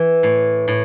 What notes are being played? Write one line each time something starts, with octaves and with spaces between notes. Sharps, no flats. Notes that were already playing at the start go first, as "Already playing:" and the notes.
Already playing: E3
A2
A2